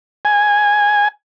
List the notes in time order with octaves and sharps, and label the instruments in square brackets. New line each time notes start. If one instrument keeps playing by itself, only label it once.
[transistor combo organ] G#5